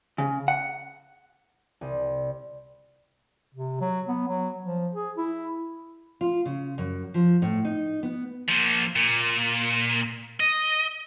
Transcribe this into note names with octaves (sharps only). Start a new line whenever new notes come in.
C#3
F#5
C2
C3
F#3
B3
F#3
F3
G#4
E4
F4
C#3
F#2
F3
A2
D#4
B3
A#2 F3
A#2
D#5